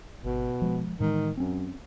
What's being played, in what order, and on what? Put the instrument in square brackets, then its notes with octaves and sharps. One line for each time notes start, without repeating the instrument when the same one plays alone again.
[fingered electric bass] G#1 [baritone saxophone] B2
[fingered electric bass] F3 G#3
[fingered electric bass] A2 E3 G#3 [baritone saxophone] D#3
[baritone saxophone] F#2 [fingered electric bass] C4 C#4